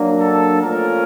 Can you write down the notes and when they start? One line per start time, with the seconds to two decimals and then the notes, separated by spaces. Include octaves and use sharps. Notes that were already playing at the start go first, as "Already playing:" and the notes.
Already playing: F#3 A#3 D4
0.20 A4
0.61 A#2 F3 A3 C#4 F4 A#4